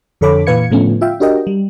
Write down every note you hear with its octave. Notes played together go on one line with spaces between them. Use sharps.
F2 D3 A4 C#5 B5 D6
A#2 E3 B4 F5 G#6 C#7
A2 D3 F3 A3 B3 C#4
F4 E5 F5 G5
D4 F#4 G4 A#4 D#5 G5
G3